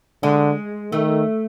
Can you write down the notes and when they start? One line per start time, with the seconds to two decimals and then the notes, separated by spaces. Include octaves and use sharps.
0.23 D3 G#3
0.92 D#3 A3